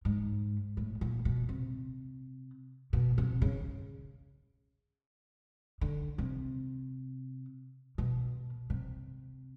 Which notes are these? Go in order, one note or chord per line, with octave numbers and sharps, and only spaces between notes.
G#2
A2
A#2
B2
C3
B2
C3
C#3
D3
C3
B2
C3